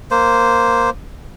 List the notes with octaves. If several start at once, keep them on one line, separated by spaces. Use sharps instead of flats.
A#3 C5